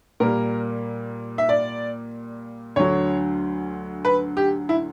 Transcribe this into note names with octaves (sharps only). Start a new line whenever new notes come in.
A#2 G3 A#3 A#4
E5
D5
D2 D3 F#3 C#5
B4
G4
E4